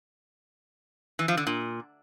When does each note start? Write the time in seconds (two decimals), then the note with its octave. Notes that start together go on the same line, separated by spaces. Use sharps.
1.19 E3
1.28 F3
1.37 D3
1.47 A#2